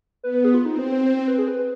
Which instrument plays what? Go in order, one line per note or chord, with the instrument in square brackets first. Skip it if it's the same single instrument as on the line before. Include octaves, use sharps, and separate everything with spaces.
[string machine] B3 [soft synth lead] B4
[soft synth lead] B4
G#4
F4
[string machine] C4 [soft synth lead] D#4
[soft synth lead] C5
C5
C5
C5
B4
G#4
B4